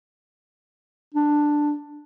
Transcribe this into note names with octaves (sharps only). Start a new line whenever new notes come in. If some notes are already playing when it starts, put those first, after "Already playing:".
D4